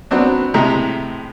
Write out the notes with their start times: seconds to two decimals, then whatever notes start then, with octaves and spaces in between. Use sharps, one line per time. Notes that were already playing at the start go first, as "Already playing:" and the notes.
0.11 F#3 B3 C4 D4
0.54 A2 C3 G#3 A#5